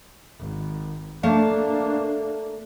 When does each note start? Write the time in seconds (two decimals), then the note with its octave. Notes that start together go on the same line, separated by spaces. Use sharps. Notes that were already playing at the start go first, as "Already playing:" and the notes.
0.39 G#1
1.23 A3 A#3 D4 F5 A5